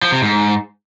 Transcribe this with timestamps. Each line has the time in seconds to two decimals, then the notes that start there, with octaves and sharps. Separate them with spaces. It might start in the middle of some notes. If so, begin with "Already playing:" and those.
0.02 F3
0.12 C3
0.22 G#2